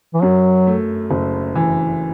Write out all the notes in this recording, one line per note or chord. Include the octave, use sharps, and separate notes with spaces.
E3
F#2 F#3
A3
F#1
E3